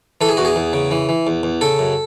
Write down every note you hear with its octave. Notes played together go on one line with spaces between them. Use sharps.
E3 A4
G#4
E2 F#4
G#4
E2
C#3
E3
E3
E2
E2
C#3 A4
F#2